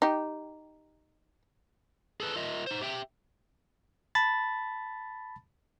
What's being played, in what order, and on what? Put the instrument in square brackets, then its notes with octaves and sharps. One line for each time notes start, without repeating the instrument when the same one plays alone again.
[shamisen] D#4 G4
[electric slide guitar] G#4 A4 B4
F4 A#4 D#5 E5
D#4 C5
G4 E5 G5
[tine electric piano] A5 B5 A6